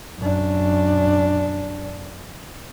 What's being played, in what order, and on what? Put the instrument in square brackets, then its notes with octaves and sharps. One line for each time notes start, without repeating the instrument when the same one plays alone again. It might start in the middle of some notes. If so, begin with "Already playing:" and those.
[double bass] F#2 D4